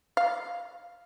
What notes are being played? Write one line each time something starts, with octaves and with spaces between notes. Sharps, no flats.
F5